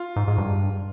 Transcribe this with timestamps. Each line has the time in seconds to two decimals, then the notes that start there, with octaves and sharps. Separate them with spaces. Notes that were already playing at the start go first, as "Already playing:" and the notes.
Already playing: F4
0.16 G#2
0.27 G#2
0.38 G2